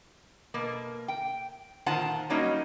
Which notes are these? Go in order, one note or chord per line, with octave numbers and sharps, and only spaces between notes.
B2 A#3
G5
A#2 D#3 F4 C5 F#5 A5
F#3 G3 A#3 C#4 D#4 D#5